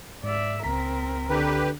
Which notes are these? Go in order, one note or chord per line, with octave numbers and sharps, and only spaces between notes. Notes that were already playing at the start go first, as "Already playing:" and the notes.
G#2 D5 E5
C#2 C4 A#4 A#5 B6
D3 G4 B4